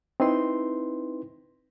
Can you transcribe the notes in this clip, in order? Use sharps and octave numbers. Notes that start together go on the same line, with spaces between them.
C4 D#4 E4 B4 C6